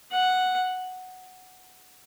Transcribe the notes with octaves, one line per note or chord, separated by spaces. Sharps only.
F#5